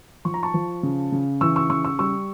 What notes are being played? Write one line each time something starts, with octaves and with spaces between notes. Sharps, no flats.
F3 C#6
A#5
A5 C#6
F3
C#3
C#3
E3 C#6 E6
C#6 E6
C#3 C#6 E6
C#6 E6
G3 C#6 E6